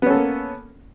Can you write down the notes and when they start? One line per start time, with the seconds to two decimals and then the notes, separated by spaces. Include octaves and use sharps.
0.02 B3
0.06 C#4
0.11 A4
0.15 A#3